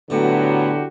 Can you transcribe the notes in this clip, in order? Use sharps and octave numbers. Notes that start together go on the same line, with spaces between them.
A2 D3 F#3 B3 E4 F#4 G4